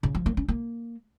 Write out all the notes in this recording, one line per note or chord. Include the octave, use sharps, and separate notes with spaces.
C#3
F3
A#3
C#4
A#3